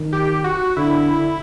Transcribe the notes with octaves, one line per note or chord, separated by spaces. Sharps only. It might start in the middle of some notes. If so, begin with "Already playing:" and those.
Already playing: D#3
G4
F#4
D3 E4